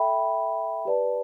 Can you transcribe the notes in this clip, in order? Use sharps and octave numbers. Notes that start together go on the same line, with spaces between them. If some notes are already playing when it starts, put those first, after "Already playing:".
Already playing: A4 E5 G5 B5
G4 B4 D5 A5